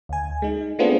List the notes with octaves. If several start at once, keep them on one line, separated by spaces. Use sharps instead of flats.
D2 G#5
G#3 D#4
A3 B3 C4 D4 F4 G#4